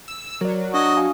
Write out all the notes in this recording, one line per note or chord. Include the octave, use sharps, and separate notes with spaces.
E6
F#3 A#4 D5
D4 F#4 D#5
F5 G#5 D#6